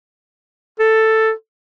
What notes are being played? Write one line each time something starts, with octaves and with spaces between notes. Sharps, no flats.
A4